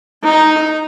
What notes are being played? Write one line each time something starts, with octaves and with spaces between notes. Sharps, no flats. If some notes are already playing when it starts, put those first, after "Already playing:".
D#4